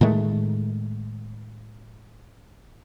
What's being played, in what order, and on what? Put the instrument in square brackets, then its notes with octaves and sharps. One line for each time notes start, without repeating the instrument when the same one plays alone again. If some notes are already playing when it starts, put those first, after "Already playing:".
[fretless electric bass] A2 D#3 G#3 A3